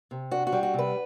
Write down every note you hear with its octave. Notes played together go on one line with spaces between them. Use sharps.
C3
D4 F#4
F#4
G3
F#4
C3 B4